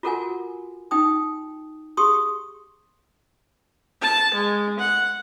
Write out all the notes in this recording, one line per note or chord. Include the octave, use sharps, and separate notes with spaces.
F4 F#4 A4 A#4 F#5 G#5
D#4 G5 D#6
G4 G#4 C6 C#6 D#6
A5
G#3
F#5